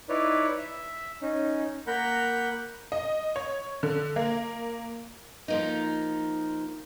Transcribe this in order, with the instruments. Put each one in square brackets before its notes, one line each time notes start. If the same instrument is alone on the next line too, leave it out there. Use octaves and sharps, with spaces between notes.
[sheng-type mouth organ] D#4 E4 B4 C#5 D5
E5
C#4 D#4
A#3 A#4 F#5 A#5 B5 G6
[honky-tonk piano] D#5
C#5
D3
A#3
[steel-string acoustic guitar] F3 A#3 D#4